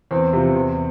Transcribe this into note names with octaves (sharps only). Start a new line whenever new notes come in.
E2 C4
C3 F3
E2